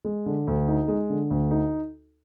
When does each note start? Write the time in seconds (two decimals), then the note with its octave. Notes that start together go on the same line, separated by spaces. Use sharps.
0.05 G#3
0.26 D3
0.47 D2
0.68 D#4
0.88 G#3
1.10 D3
1.30 D2
1.51 D#4